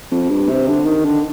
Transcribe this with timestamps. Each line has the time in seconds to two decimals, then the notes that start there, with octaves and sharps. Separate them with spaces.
0.11 F2
0.29 G2
0.49 C3
0.68 D3
0.86 D#3
1.05 D3